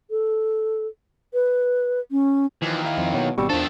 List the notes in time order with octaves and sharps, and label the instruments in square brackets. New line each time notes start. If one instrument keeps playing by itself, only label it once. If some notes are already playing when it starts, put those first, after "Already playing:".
[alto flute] A4
B4
C#4
[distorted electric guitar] D#2 [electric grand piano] E3 F3
[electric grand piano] D#4 E4 F5
[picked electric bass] F2
[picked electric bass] B2 [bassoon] F#3
[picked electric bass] G#1 B2 [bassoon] G3 [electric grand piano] C#6 E6
[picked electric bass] E2 D4 [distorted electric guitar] D#3 A4 [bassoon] F3